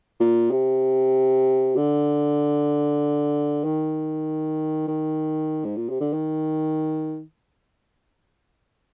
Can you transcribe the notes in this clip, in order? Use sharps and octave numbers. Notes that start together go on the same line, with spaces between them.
A#2
C3
D3
D#3
D#3
G#2
A#2
C3
D3
D#3